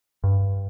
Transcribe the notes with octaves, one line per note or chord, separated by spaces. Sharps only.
G2